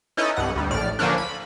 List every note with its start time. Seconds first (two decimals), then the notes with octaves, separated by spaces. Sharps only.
0.17 C#4 D#4 E4 A4 B4 D#5
0.37 C2 G2 F#5
0.56 D2 G3
0.70 A#1 A2 D5 F6
0.99 D3 F3 A#3 C#4 D4
1.18 B5